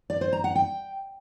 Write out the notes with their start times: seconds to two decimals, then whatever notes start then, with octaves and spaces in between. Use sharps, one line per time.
0.10 D5
0.21 C5
0.33 A#5
0.44 F#5
0.55 G5